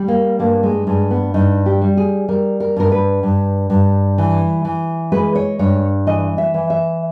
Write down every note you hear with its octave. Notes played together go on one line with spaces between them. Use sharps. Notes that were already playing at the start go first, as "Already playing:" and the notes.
Already playing: G3
A#3
G2 A#3
G#3
G2 G#3
B3
G2 D#4
G4
G3
G#4
G3 A#4
A#4
G2 A#4
B4
G2
G2
E3
E3
G#3 B4
C#5
G2 C#5
E3 D#5
E5
E3
E5